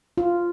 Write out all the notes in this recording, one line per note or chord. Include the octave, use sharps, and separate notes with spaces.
F4